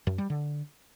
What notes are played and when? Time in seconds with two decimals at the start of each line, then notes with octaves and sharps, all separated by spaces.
0.07 F#2
0.18 G3
0.30 D3